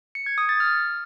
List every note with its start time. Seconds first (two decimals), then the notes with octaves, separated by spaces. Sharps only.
0.15 C#7
0.26 G#6
0.38 D#6
0.49 A6
0.60 F6